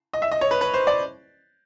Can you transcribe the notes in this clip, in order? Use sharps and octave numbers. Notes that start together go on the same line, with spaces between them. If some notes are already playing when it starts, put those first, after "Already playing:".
D#5
E5
D#5
C#5
B4
B4
C5
D5